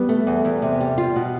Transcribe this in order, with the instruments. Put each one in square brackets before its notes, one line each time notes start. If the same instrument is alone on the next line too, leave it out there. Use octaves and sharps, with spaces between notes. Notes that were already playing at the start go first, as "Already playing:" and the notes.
Already playing: [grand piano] G3 B3
[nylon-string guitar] A3
E2
E2
C3
G3
F4
B2